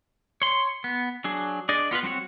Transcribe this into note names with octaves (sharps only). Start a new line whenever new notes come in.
C#5 C6
B3
F#3 D4 G#4
D4 G#4 D5 D#5
B3 F4 A#4 B4
G3 C4 F#4 C#5